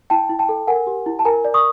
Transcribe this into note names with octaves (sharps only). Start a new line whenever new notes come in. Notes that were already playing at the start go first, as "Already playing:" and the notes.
E4 G5 A5
E4
G5 A5
A4
A#4 F#5 G#5
G4
E4
A5
A#4 G#5 A#5
D5
C#6 D#6